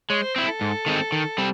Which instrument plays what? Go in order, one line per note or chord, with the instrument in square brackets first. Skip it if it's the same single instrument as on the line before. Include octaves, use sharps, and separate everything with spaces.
[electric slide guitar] G#3 [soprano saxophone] C#5
[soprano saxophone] C5
[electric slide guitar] C4 E4
[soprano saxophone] A4
[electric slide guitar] G#2
D#3 G#3 C4
D#3
G3 C4